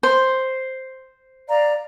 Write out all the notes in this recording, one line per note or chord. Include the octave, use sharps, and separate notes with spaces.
C5
D5 F5 A#5